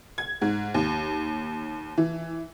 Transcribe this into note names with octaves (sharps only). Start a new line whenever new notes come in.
G#6
G#2
D#2
E3